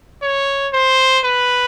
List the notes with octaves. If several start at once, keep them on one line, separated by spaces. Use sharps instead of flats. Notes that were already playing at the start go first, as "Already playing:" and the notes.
C#5
C5
B4